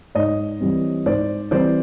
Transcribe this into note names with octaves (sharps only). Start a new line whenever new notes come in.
G#2 C#5 D#5
E3 G3 C4
G#2 C5 D5
E3 G3 C4 C5 D5